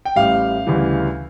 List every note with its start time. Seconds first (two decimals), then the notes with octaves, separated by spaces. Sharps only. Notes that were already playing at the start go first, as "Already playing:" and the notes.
0.05 G5
0.16 A1 A2 G3 F5
0.66 D2 C#3 E3 G3